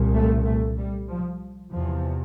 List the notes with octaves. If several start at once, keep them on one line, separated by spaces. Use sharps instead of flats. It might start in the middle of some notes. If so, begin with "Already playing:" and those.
Already playing: C2 A#2
A3
A3
G3
F3
E2 C3 F3